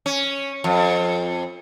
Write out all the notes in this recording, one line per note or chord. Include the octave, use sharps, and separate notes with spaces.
C#4
F2